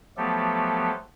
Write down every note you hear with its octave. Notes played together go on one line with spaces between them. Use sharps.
F3 F#3 A3 B3 G4 A4